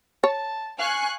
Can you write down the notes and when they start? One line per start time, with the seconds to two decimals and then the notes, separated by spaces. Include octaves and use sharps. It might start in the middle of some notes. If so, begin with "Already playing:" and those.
0.24 C#5 A5
0.79 F5 G#5 C#6 F#6